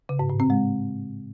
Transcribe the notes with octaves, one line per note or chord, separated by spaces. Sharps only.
C#3
G#2
A2
C4
G#3